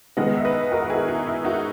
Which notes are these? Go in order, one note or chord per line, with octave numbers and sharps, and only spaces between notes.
D#3 G#3 B3 D#5 F#5
E5
B4 D#5
F#4 A#4
F#4
E4 G#4
D#4
E4
D#4 F#4